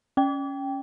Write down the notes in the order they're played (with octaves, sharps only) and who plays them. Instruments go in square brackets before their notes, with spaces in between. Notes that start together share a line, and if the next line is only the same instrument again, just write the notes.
[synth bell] C#4 G5